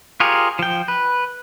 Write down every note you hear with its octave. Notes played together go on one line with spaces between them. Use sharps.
F4 G4 G#4 A#4 C#5
F3 G5
B4